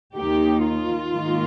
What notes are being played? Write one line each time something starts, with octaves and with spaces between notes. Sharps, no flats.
D#2 D#3 A#3 D#4 G4
F4
G#2 D#3 A#3